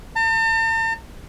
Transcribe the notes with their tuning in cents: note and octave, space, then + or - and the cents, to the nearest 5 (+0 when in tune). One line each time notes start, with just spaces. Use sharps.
A5 +45